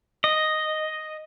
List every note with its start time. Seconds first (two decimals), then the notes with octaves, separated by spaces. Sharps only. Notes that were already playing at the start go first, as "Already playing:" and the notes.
0.24 D#5